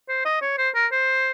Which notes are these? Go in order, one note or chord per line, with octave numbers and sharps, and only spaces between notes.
C5
D#5
C#5
C5
A#4
C5